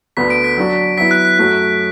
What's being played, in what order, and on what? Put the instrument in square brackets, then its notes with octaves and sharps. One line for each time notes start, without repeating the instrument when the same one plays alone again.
[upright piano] D2 D3 B3 [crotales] B6
[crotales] D7
B6
[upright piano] F#3 D4 F#4
[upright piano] F#3 B3 E4 [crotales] B6
[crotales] F#6
F#6
[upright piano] F#2 F#3 A3 F#4 [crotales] F#6